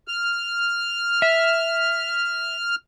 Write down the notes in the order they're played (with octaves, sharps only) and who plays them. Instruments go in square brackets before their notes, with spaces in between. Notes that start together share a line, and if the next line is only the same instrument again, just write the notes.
[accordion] F6
[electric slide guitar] E5